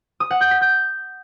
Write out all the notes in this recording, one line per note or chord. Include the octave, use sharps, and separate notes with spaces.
D#6
F#5
G6
B6
G6